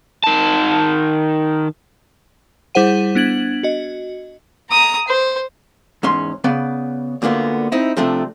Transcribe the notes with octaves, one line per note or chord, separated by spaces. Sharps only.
D#3 A5
G3 E4 G#4 C5 F#5 D#7
B3 D4 G#6 F#7
F#4 D#5
A#5 D#6
C5
E2 G#2 C#4 C6
C#3 B3 D5
D2 A#2 D3 A#3 B3
C4 D#4 E4
C3 F3 A3 D4